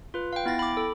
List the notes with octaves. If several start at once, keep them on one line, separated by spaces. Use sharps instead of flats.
F4 B4
F5 G5
B3 E4 G5 A6 A#6
B5 D6
A4